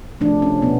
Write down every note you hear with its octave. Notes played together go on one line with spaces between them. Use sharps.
C3 F3 A3 D4
C#4
B2 B3